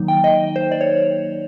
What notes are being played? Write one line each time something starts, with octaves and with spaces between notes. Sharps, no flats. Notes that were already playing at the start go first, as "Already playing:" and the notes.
Already playing: D#3 F#3 A#3 D#4
G5
D#5
C5
D5
C#5